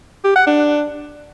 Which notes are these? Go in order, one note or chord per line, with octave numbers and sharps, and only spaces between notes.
G4
F#5
D4